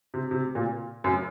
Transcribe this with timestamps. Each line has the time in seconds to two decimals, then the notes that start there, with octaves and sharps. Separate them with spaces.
0.14 C3
0.31 C3
0.55 A#2
1.04 F#2